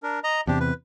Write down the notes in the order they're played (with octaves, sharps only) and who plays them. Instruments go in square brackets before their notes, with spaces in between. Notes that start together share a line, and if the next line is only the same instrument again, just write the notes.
[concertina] D4 A#4
D#5 A#5
[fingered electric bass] E2 C3 [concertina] D4 G4
[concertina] B4